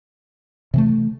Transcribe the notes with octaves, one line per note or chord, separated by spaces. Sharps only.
C3 E3 A3